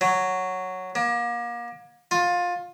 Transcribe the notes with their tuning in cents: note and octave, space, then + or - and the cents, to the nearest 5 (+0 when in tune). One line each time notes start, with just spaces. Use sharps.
F#3 +0
A#3 +35
F4 +20